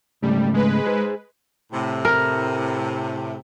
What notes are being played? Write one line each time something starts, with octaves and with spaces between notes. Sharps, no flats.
G#2 C#3 G3 A3
G#3 B4
G#4 C5
A2 C3
A#4